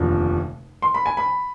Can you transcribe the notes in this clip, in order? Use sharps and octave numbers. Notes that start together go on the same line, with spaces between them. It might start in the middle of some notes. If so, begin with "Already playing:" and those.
Already playing: F1 D#2 D3 F3
C6
B5
G#5
B5